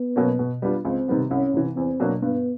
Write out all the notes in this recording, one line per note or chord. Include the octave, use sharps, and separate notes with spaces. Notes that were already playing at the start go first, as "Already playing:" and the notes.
Already playing: B3
B2 F#3 A#3 C#4
B2
G3 B3 D4 F4
C#2 C4
C3 D#3 G3 B3
C2 C#4
C3 E3
E2 C4
B2 F#3 A#3 D4
G2 B3